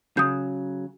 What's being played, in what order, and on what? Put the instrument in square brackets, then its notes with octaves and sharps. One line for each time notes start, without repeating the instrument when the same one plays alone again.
[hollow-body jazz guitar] C#3 F#3 [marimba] D#6 G6